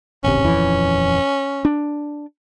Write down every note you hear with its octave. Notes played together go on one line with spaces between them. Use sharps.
D1 G#1 C3 C#4
D#1 F2 E3
D4